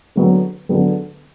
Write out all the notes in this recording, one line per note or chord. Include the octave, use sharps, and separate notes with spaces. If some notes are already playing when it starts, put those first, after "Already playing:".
D3 F#3 B3
D3 F#3 B3